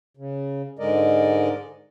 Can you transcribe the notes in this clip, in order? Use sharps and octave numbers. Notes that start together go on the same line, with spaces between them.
C#3
G#2 D3 G#3 A#4 D5 D#5